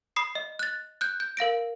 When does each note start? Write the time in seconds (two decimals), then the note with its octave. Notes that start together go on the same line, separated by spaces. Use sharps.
0.16 B5 D#6 C7
0.35 D#5
0.59 F#6 A6
1.01 F#6 G6
1.20 G6
1.37 A#4 F5 A#6 D7